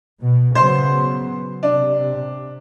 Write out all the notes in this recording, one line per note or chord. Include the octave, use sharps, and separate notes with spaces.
B2
C#3 F#3 B3 C5 C6
C3 D4